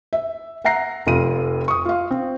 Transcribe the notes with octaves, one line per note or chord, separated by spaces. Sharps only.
E5
E5 F#5 A#5 A#6 C7
F1 F2 F4 D#7
C#6 D#6
F4 F5
C4